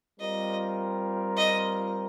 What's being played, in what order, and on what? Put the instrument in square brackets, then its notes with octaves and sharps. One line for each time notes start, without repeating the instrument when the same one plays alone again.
[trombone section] G3 C4 F4 A#4 [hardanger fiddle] D#5
[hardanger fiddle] D#5